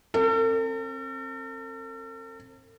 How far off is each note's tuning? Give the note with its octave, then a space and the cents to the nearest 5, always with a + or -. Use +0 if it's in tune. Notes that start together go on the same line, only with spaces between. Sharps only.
C4 +30 A4 +45